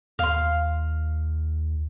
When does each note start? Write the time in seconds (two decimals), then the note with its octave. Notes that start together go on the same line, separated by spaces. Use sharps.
0.19 D#2 F5 C6